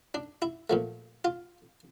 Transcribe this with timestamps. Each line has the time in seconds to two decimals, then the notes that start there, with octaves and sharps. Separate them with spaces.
0.14 D4
0.42 E4
0.70 A#2 F3 A3
1.25 F4